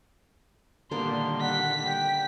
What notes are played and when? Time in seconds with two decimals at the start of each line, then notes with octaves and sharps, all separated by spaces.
0.91 A#2 D3 D#3 G3 A#3 B3 C6
1.42 F#5 B6
1.86 G5